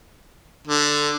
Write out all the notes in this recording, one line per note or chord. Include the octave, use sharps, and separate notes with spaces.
D3